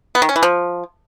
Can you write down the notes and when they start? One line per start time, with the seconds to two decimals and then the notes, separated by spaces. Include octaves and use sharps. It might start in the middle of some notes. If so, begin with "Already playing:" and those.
0.15 B3
0.22 D#3
0.29 C#4
0.36 E3
0.43 F3